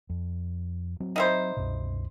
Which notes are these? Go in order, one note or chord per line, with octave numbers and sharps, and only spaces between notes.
F2
F#3 C4
D#4 E4 C5
C2 F#2 B2